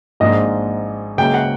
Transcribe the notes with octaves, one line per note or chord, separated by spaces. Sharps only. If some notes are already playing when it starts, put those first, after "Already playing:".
G#1 G#2 F3 A#3 D4 D#5
C#2 C#3 F#3 A#3 C#4 G5
F#5